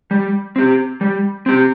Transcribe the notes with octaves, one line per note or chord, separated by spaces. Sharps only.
G3
C4 G4
G3
C4 G4